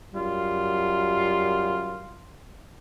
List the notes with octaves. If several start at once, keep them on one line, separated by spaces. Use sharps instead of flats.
F#2 G3 F4